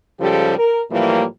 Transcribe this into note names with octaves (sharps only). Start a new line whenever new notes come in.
G#2 C#3 F3 G3 G4 A4
A#4
A2 E3 F3 G3 A#3